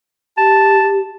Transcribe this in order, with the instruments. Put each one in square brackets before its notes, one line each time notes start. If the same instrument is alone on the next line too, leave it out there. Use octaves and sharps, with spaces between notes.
[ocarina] G4 [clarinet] A5